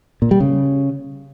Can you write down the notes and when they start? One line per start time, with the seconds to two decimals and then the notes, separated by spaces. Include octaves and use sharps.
0.22 A#2
0.31 G3
0.40 C#3